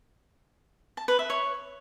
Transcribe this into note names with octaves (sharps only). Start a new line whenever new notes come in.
A5
B4
E5
C#5